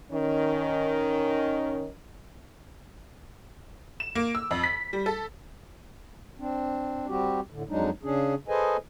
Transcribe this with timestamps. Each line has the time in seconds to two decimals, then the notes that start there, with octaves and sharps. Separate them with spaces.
0.12 D#3 C#4
4.00 E7
4.15 A#3
4.35 E6
4.51 F2
4.64 B6
4.93 G3
5.06 A4
6.39 C4 D4
7.08 G3 C4 F#4 G4
7.51 A2 D3
7.69 F2 F#3 G#3 D4 D#4
8.03 C#3 C#4 D4 G#4
8.48 G#4 A4 B4 C5 D#5 G#5